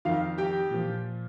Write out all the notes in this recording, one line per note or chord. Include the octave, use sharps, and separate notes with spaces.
F2 D#3 F4 F5
G4 G5
A#2 F3